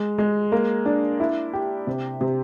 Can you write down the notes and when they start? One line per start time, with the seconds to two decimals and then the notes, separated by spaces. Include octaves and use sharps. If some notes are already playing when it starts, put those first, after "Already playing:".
Already playing: G#3
0.18 G#3
0.52 A#3
0.86 D4
1.20 E4
1.53 G4
1.87 C3
2.21 C3